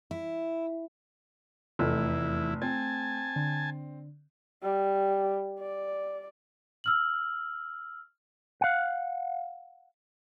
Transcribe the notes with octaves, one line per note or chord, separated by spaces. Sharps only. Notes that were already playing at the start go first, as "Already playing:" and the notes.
E4
F1 E2 A3 E4
C4 G#5 A5
D3
G3
D5
E6 F6 F#7
F5 F#5